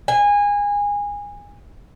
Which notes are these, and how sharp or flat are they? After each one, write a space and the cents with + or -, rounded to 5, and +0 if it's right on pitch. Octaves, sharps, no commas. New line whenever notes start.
G#5 -25